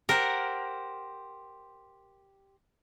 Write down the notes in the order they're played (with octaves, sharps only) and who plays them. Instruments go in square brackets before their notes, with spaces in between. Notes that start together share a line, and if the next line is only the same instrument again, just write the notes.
[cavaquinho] G4 C5 F#5 [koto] A#4